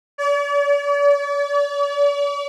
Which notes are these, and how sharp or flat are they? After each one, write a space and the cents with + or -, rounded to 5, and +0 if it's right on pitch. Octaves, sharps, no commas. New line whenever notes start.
D5 -45